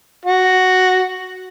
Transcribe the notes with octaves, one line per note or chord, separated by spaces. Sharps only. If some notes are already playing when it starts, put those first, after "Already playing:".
F#4